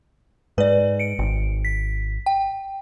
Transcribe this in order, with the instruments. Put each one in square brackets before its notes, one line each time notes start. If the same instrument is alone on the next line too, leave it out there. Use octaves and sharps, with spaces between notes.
[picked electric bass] G#2 [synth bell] B4 D5
[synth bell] C#7 D7
[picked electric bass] G#1
[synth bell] B6
G5